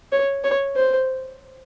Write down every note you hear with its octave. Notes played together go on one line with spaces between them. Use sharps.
C#5
C#5
C5